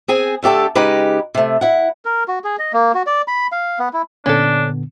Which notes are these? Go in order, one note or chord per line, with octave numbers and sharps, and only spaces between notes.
C4 G#4 G#5
D3 A3 G4 A4 A5
C#3 G#3 D#4 G4 B4
C3 A3
E4 F#5
A#4
F#4
G#4
D#5
A#3
F#4
D5
B5
F5
B3
E4
A#2 D3 B3 C#4 D4 A4